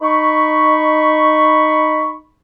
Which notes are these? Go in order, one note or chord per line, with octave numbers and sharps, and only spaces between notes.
D#4 B5 C#6